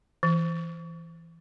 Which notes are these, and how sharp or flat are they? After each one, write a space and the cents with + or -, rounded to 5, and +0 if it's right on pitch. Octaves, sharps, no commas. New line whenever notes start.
E3 +10